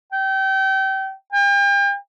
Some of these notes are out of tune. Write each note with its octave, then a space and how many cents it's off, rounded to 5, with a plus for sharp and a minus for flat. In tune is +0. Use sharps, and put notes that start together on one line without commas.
G5 -30
G5 +40